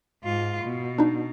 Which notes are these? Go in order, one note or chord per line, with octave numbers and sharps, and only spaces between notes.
G#2 F4
B2
D4 D#4